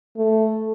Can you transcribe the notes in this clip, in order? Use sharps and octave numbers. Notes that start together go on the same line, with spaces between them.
A3